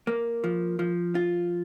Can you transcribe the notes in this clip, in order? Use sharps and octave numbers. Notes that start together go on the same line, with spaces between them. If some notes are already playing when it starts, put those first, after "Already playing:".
A#3
F3
F3
F4